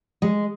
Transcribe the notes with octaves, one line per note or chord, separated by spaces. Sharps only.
G#3